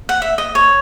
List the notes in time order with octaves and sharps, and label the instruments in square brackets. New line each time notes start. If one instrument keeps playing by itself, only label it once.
[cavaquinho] F#5
E5
D#5
C#5